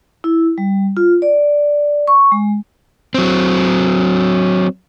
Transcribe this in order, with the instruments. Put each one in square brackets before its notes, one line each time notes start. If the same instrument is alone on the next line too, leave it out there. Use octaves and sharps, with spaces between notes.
[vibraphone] E4
G3
F4
D5
C#6
G#3
[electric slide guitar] F#3 C4